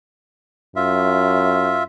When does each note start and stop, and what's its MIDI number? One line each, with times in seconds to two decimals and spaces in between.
0.76 1.85 42
0.76 1.83 65
0.76 1.83 76